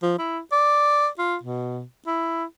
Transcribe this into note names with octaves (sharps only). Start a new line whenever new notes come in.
F3
E4
D5
F4
B2
E4